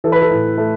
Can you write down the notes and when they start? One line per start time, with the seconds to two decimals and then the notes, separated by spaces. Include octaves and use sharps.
0.04 E3 A4
0.12 B4
0.22 A4
0.30 A2
0.58 A3